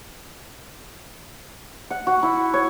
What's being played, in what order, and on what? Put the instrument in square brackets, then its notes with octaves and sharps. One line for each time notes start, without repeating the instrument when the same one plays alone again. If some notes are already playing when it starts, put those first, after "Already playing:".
[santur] F#5
F#4
E4
C#5